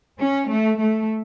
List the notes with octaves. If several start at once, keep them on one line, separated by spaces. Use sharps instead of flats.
C#4
A3
A3